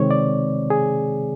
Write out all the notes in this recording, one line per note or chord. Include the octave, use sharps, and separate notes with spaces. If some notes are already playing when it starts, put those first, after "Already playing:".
Already playing: C3 D#3 G#3 C4 C#5
D5
G#4